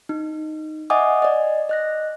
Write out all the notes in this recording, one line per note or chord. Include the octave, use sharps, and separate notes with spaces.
D#4
D#5 E5 F#5 G#5 D6 D#6
D5 D#5
D#5 F#6 A#6